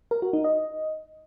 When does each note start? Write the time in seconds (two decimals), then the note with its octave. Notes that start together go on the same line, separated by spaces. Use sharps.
0.11 A#4
0.22 F#4
0.33 D#4
0.44 D#5